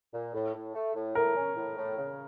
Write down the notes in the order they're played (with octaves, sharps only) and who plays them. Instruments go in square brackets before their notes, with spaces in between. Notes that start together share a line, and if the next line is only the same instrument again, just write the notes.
[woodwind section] A#2
A2
A2
A3
A2
[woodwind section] A2 [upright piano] A#4
[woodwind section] C#4
A2
A2
C#3